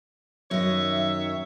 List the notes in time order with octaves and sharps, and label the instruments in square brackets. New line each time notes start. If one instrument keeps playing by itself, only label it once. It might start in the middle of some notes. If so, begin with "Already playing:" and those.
[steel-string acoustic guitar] F#2 D#5 [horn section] D#3 C#5 E5